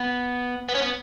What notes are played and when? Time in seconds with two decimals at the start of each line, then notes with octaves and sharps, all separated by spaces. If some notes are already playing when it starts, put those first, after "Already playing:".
Already playing: B3
0.69 B3
0.75 C#4
0.82 B3